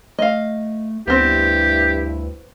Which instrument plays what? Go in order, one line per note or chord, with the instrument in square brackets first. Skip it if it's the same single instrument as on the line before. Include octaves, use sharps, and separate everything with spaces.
[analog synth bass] A3 [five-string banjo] D#5 F5
[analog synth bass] D2 [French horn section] G2 E4 [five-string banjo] B3 C4 [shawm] G4